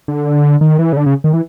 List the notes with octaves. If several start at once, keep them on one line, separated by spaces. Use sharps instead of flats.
D3
D#3
E3
C#3
D3
C#3
D#3
E3